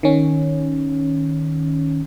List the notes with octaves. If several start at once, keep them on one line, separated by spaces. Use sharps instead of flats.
D#3 C#4